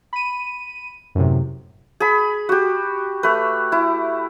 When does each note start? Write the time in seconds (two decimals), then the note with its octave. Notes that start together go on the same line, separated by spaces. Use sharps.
0.13 B5 D#7
1.15 F#2 A2 C3
2.00 G#4 B5
2.49 F#4 G4
3.23 A3 B4
3.72 E4